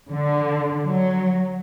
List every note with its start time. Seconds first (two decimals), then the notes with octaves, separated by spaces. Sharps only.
0.11 D3
0.87 F#3